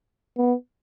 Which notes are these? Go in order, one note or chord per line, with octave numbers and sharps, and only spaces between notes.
B3